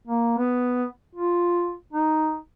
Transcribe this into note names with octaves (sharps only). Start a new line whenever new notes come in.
A#3
B3
F4
D#4